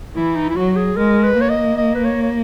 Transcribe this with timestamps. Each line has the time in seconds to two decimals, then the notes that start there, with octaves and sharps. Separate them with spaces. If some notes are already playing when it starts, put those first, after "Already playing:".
0.15 E3 E4
0.36 D#4
0.49 E4
0.56 F#3 F#4
0.76 G#4
0.97 G#3 A#4
1.24 B4
1.37 A#3 C#5
1.50 D#5
1.77 D#5
1.95 B4
2.04 C#5
2.23 C#5